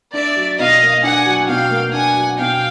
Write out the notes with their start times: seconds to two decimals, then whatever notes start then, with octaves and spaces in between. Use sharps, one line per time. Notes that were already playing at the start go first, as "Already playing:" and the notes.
0.14 D4 D5 E5
0.36 F#3
0.59 B2 D#5 F5
0.82 A#3
1.03 D4 F#5 G#5
1.26 F#3
1.48 B2 F5 G5
1.71 A#3
1.93 D4 F#5 G#5
2.16 F#3
2.37 B2 F5 G5